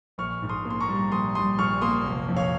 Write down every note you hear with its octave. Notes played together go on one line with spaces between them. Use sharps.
A#1 C#6 F6
G#2
C6 D#6
A#3
C6
A#5 C#6
G3
A#1 C6 D#6
G3 C6 D#6
A#1 C#6 F6
A#3 C6 D#6
F1
F2
C#5 F5